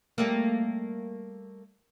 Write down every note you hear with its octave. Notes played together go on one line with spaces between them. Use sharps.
G3 A3 A#3